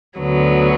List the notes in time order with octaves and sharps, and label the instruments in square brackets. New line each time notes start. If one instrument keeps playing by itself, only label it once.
[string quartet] D2 D3 F#3 B3